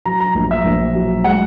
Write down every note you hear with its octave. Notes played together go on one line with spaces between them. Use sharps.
F#3 A#5
A#5
A#1
E5
A#1
F#3
G#3 F#5